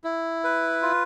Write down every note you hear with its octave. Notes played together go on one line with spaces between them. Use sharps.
E4
B4
F4